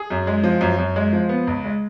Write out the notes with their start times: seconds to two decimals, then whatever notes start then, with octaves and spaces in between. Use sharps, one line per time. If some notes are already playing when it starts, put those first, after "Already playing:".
Already playing: G#4
0.10 F#2
0.27 G#3
0.43 F3
0.61 F#2
0.78 F#2
0.96 G#3
1.13 F3
1.29 B3
1.47 C#2
1.64 G#3